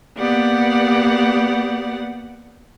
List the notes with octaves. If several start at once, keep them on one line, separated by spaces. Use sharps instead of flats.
A#3 B3 G4 D5 F#5